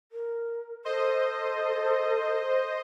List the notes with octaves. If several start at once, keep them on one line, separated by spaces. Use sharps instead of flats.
A#4
A4 C5 D#5